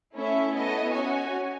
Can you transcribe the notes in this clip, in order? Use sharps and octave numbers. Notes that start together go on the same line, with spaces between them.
A3 C#4 E4 A4 E5
B3 E4 A4 D#5
C#4 F#4 C#5 G#5